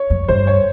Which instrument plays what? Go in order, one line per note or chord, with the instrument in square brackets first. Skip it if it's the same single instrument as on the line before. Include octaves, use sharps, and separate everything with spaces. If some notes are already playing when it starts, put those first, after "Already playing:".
Already playing: [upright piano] C#5
[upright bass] F2
[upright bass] G2 [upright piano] C5
[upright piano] C#5